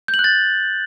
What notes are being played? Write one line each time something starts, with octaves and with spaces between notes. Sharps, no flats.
G6
F#7
F#6
A6